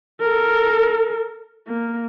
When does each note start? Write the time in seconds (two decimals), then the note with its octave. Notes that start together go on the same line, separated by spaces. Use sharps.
0.20 A4 A#4
1.67 A#3